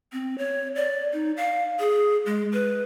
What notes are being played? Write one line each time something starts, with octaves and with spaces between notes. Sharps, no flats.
C4
C#5
D5
D#4
F5
G#4
G#3
B4